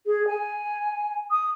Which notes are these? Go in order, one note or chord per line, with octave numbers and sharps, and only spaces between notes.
G#4
G#5
D#6